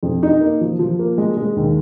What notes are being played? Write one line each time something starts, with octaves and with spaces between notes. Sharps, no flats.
F2
D#4
A#3
F3
F3
A#3
G#3
G#3
D#2